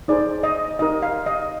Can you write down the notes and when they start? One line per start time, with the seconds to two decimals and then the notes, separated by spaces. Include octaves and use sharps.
0.08 D#4 G#4 C5 D5
0.43 D#5
0.79 D#4 G4 A#4 D#5
1.03 F5
1.26 D#5